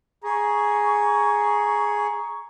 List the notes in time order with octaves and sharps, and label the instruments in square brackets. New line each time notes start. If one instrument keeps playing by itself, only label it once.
[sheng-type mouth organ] G#4 [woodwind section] A#5 C#6